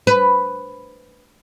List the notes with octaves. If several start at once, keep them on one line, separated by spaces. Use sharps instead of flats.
B4